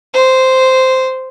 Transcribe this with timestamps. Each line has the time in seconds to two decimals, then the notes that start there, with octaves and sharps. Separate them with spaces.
0.14 C5